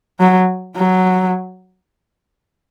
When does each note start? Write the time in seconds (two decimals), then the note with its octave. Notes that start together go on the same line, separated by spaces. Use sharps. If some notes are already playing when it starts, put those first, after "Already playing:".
0.20 F#3
0.76 F#3